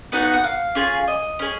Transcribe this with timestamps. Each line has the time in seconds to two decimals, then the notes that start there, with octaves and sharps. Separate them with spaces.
0.12 B3 D#4 F#4 F#5
0.23 F#5
0.33 F#5
0.44 F5
0.75 C#4 F4 G#4
1.08 D#5
1.39 C#4 G#4